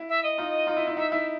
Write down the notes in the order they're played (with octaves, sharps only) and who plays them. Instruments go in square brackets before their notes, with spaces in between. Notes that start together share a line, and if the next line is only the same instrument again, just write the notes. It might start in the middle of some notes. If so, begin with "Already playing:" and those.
Already playing: [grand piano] E4
[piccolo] E5
D#5
[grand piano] D#4 F4
D#4 F4
E4
E4
[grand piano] D#4 [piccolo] E5
[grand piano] E4 [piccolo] E5